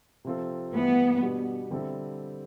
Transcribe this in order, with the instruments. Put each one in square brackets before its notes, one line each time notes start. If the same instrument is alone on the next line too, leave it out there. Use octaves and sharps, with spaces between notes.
[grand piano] C3 F3 C4 F4 A4
[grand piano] G2 E3 A3 E4 G4 [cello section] B3
[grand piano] B2 G3 D4 G4
D3 G3 C4 E4 A4